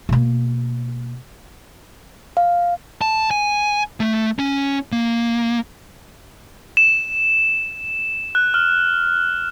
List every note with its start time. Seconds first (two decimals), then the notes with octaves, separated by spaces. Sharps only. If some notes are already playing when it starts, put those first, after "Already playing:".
0.09 B2 A#3
2.37 F5
3.01 A5
3.31 G#5
4.00 A3
4.39 C#4
4.92 A#3
6.77 E7
8.35 F#6
8.54 F6